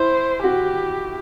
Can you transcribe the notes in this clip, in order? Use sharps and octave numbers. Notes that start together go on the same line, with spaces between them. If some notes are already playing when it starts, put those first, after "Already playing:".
Already playing: E4 C5
F#4 G4